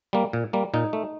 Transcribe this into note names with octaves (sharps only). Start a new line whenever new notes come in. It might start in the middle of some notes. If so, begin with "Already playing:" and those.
G3 A#3
A#2
G3 A#3
A#2 D#4
A3